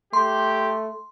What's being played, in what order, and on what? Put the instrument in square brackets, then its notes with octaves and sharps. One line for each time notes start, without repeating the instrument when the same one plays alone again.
[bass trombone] A3 [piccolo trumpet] G4 [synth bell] C6